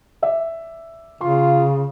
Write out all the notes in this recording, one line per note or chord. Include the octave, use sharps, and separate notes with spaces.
D5 E5
C#3 F4 C6